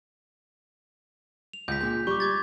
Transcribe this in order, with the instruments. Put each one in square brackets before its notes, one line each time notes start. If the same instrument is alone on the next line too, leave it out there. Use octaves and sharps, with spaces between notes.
[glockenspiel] F7
[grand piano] C#2 [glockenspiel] G6 B6
[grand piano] A#2 G#3 [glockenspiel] G6
[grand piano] G3 [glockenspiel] C#6 D6
[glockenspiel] D6 G#6 A6